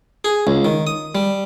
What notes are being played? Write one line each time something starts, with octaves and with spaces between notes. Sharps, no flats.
G#4
C#2
D#3
D#6
G3